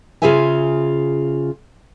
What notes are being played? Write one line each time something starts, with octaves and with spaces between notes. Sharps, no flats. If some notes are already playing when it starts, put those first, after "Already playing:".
C#3 F4 G#4 C5 E5 G#5